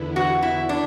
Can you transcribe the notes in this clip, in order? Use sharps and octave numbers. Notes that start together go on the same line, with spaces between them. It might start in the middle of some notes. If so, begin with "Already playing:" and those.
Already playing: E2 D3 B3 E4
F#4
E4
D4